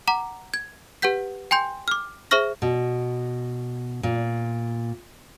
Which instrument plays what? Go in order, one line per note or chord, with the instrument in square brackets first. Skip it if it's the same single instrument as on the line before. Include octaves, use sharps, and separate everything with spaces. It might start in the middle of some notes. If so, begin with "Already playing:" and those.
[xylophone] F#5 A#5 D6
G#6
G4 B4 F#5 G6 B6
G5 G#5 C6 G6
D6 F6
G#4 C5 E5 C#6 F6 A#6
[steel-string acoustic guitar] B2
A#2